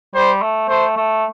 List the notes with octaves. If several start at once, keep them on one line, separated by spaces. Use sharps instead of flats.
G3 C5
A3
A3 C5
A3